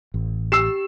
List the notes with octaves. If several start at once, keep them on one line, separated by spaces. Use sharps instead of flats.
A1
G4 E6 C7 E7